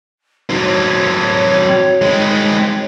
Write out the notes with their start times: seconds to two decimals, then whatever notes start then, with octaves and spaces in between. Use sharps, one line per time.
0.50 F#3 C4 D#4
0.62 C#5
2.02 G#3 C4